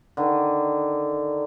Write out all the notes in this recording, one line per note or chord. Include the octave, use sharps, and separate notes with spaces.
D3 D#3